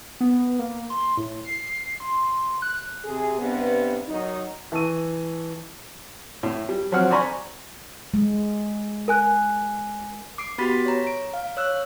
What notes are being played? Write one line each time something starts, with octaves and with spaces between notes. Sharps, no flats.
B3
A#3
C6
A2
C7
C6
F#6
C3 G#4
G2 C3 B3
D#3 F#3 D#4
E3 A5 C#6 E6 D#7
A2
G3
F3 F#3 C4 F#5 F6
C5 D5 G#5 A#5 B5 C#6
G#3
A#4 G#5 F#6
D6 C7 D7
B3 F#4 G4 B5 A6 B6
C#5 A#5
D7
F5
C#5 E6 F#6